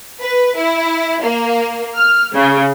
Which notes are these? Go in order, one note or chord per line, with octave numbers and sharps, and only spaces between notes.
B4
E4
A#3
F6
C#3